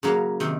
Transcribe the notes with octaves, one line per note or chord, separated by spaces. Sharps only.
C#3 F#3 A#3
C3 D#3